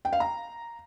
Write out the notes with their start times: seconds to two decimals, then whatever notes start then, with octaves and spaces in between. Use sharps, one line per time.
0.05 G5
0.13 F5
0.20 A#5